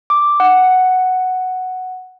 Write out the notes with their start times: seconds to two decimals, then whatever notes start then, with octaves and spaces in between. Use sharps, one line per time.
0.10 D6
0.40 F#5